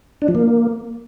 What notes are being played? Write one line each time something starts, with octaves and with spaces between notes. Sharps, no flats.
D4
F3
A#3